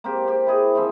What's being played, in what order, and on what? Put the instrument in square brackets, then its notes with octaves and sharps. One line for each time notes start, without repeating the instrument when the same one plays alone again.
[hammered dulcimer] A#3 C4 G4
C4 G4
E4 G#4 D#5
E3 F3 C4 E5